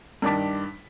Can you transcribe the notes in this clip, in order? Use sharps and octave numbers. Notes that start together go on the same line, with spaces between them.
G2 D#3 D4 A5 D6 B6